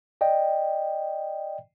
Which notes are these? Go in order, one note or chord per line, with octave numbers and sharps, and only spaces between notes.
D5 D#5 G5